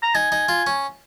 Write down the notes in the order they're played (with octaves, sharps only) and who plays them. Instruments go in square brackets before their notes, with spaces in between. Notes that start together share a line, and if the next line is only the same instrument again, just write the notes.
[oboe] A#5
[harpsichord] D#4 [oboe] G#5
[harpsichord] D#4
F4
C#4